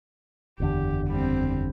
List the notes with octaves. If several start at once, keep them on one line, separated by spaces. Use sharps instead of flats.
F#1 E2 D3 G4
G3 C4